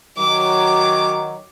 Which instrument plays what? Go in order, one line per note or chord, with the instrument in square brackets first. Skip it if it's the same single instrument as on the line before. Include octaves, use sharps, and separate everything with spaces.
[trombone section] D#3 F#3 [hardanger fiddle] D6